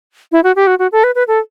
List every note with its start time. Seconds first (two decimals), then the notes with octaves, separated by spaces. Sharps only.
0.32 E4
0.43 F#4
0.56 G4
0.67 F#4
0.79 F#4
0.92 A4
1.04 B4
1.15 B4
1.28 A4